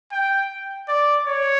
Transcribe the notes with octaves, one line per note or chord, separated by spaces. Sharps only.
G5
D5
C#5